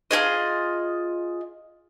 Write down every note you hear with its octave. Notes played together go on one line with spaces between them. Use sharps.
F4 G4 G#4 D#5